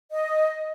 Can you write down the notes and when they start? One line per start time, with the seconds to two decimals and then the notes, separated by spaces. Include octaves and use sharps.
0.11 D#5